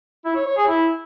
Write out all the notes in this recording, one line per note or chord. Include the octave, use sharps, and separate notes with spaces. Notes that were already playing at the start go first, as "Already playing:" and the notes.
E4
C#5
C#5
G#4
E4